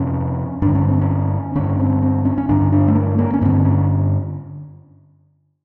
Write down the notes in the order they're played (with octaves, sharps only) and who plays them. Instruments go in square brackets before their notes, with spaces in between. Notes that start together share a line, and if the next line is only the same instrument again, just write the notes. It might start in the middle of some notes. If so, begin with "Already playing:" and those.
Already playing: [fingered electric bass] F2 C3 C#4
G2 D3 D4
C#4
C4
C#4
G2 D3 C#4
C4
C4
C#4
C#4
G2 D3 D4
D4
A3
A#3
A#3
C#4
G2 D3 C4
C#4